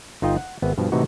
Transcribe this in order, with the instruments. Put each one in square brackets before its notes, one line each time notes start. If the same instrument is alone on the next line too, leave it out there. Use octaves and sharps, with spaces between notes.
[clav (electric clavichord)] G1 D#4 F4 D#5 G5
F#5
G#1 B3 E5
G2 B2 F3
A2 C3 E3 A3 D#4 F#4